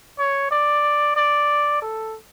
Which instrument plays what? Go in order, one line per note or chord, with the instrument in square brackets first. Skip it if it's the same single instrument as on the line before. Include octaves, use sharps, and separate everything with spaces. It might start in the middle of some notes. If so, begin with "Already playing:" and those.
[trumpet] C#5
D5
D5
A4